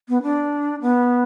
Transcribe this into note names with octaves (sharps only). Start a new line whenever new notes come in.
B3
D4
B3